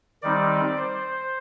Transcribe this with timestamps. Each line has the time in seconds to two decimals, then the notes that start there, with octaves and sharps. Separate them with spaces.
0.22 D#3 G3 C4 D#4 D5
0.77 C5